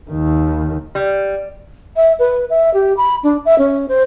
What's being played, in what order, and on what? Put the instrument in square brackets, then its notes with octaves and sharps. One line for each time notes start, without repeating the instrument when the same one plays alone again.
[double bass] D#2 D#3
[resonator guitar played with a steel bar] G3
[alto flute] E5
B4
E5
G4
B5
D4
E5
C#4
C5